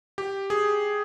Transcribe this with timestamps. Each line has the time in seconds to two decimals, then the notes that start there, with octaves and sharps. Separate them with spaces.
0.18 G4
0.50 G#4